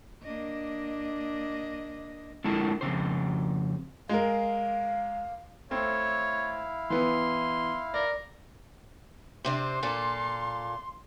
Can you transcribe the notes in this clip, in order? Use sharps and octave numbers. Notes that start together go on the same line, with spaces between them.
A#3 D4 D#5
D3 G#3 A#3 E4 A5
F2 G#2 C#3 C5
G#3 A#4 F5
A3 C4 E4 C#5 F5
E3 B3 C6
A#4 D5
C3 C4 D4 C6
A#2 A#3 A4